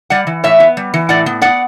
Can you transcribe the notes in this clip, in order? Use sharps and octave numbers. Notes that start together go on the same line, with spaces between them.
G3 D5 F#5
E3
A2 C#5 E5
B3
G3
E3
A2 D5 F#5
B3
B3 D5 F#5